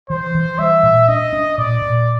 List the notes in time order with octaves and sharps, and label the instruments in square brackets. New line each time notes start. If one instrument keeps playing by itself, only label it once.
[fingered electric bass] E3 [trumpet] C5
[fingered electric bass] E3
[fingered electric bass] G3 [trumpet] E5
[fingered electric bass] A#2
[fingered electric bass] D4 [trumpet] D#5
[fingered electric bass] D4
[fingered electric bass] A#2 [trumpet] D5
[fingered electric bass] A#2